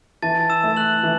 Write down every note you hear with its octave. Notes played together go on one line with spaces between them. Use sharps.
E3 A5 A6
E6 E7
A3 E4
F#6 F#7
E3